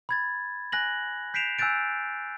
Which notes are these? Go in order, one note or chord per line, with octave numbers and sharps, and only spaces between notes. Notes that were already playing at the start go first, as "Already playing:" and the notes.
B5 G#6 A6
G#5 F#6 A#6 F#7
G6 B6 C7 D7 E7 F7
G#5 E6 F#6 G6 A6 D7